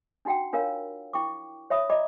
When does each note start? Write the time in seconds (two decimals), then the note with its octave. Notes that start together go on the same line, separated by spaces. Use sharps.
0.25 D4 D#4 F#4 F#5 G5
0.53 D4 F4 A#4 C#5 F5
1.13 E4 G5 C#6 D6
1.70 C#5 E5 B5 D#6
1.90 D5 D#5 A#5 B5 D6